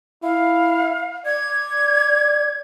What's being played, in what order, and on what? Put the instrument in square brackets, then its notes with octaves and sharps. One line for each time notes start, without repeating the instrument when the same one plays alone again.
[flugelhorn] E4 [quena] F5
[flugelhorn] D5 [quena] G#6